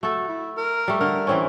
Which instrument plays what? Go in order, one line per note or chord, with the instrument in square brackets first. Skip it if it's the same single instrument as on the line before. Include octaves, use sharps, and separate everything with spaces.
[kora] A3 A4 [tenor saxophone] F#4
[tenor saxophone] E4
A#4
[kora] G3 A3
[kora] D3 [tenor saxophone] A#4
[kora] E3 C4 C#4